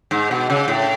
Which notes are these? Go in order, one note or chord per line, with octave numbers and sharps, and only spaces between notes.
G#2
B2
C#3
A2